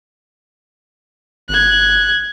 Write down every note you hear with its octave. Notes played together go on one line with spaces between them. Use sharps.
G#1 F#6 G#6